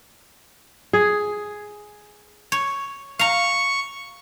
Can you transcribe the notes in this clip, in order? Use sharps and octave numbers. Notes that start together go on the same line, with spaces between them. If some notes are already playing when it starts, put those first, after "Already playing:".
G#4
C#5
F5 A#5 C#6